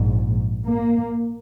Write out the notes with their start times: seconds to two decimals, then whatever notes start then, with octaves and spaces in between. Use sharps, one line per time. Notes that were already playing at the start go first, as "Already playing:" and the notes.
Already playing: A#1 G#2
0.66 A#3